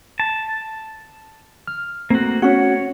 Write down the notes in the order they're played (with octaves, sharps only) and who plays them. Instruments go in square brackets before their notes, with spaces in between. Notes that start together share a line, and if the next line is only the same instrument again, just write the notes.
[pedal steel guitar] A5
[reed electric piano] F6
[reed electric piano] A3 C4 [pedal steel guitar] A#3 F#4
[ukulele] C#4 F#4 [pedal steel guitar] C#5